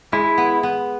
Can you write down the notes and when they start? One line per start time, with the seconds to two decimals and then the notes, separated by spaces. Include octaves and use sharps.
0.12 G#3 E4
0.38 B3
0.63 B3